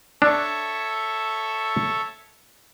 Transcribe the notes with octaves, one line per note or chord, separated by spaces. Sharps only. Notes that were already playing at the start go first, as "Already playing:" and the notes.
D4 A4 C#5 E5